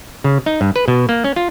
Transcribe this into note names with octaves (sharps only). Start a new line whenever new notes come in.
C#3
D#4
G2
B4
B2
A#3
C#4
F4